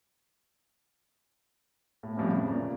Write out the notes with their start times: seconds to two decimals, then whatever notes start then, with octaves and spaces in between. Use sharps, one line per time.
2.03 A2
2.17 F2 A2 G3 B3 C#4
2.33 C#3
2.50 A#2 C#3